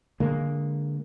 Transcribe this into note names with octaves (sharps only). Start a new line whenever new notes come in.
D3 G#3 A#3